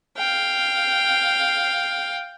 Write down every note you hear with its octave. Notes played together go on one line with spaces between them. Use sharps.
F5 G5